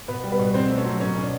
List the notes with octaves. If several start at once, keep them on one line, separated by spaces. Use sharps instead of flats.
B2 B3 B4
G3
B3 B4
B2
B2 C4 C5
A3
C#4 C#5
F#3
B2 C#4 C#5
B2
D4